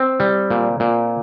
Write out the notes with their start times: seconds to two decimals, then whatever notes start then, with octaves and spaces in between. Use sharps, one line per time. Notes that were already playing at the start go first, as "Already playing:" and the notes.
Already playing: C4
0.20 G3
0.50 A#2
0.80 A#2